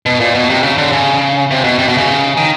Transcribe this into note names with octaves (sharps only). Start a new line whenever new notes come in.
B2
A#2
B2
C3
C#3
D3
C#3
C3
B2
C3
B2
C#3
D#3